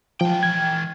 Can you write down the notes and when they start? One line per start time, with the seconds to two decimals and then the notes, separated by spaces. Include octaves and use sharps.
0.21 E3 F3 G5
0.43 G#6